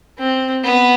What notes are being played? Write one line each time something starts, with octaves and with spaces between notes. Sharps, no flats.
C4
B3